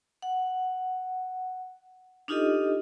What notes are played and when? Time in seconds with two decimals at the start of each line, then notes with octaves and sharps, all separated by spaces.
0.22 F#5
2.28 D4 D#4 F4 G4 A4 D#5